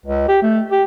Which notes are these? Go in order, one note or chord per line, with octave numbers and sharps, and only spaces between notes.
C#2
G4
A3
G4